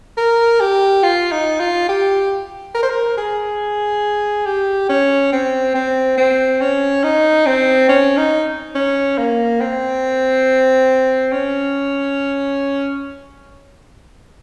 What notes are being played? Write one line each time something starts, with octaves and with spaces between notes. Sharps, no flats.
A#4
G4
F4
D#4
F4
G4
A#4
C5
A#4
G#4
G4
C#4
C4
C4
C4
C#4
D#4
C4
C#4
D#4
C#4
A#3
C4
C#4